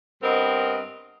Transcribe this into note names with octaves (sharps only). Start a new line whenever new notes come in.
G2 B3 C4 A#4 D#5